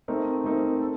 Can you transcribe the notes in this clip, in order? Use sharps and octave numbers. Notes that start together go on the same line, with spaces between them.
A3 C4 D#4 A#4
A3 C4 D#4 A#4
A4